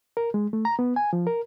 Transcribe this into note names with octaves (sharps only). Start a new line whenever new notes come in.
A#4
G#3
A3
A#5
B3
G#5
F3
A#4